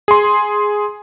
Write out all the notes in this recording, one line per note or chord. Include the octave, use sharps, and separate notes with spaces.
G#4 C6